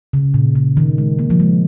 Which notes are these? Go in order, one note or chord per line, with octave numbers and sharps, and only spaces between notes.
C#3
A#2
C#3
D#3
G#3
A#3
F3
G#3